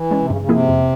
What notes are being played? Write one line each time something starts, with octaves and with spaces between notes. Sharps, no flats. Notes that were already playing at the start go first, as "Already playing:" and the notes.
Already playing: E3
G#3 C#4
C3
G2 C#3
C#3
C3 F3 A#3 E4 G#4
F2